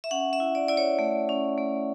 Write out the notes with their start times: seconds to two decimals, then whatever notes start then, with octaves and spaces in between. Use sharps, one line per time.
0.04 E5
0.11 C#4 F#5
0.33 E5
0.40 E4
0.55 D5
0.68 E4 D5
0.77 C#5
0.99 A3
1.29 C#4
1.58 A3